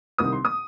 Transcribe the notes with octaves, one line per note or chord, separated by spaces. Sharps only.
C2 C3 D#3 C4 D#6
C6
D#6